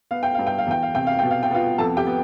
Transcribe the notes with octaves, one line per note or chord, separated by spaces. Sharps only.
B3 F5
G5
G2 F5
G5
F5
E2 G5
F5
C3 G5
F5
B2 G5
F5
G5
B3 F4 F5
F2 A4 A5
G4 G5
B3